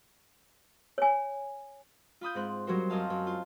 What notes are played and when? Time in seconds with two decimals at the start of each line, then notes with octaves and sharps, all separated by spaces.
0.98 C#5 G#5
2.21 F4 B5 D#6 G6
2.35 G#2 C4 F#6
2.67 F#3 G3 F#4 A#4 C5
2.90 F#2 C4 D#5 F5 A5
3.10 F#2
3.27 F4